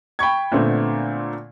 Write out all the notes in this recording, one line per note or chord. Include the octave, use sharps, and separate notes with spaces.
G5 B5 C#6 G#6
A#2 D3 A3 B3 C4